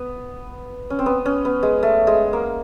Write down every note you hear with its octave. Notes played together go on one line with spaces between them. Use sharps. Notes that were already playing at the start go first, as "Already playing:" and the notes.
Already playing: B3
C#4
C4
B3
C#4
B3
G#3
A3
G#3
A#3